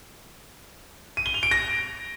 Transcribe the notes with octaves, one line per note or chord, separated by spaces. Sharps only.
D#7
G7
F7
D7
A#6